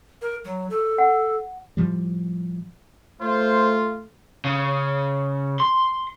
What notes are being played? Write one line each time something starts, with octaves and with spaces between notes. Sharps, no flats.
A#4
F#3
A4
F#5
A2 F3 G3
A3 F4 C5
C#3
C6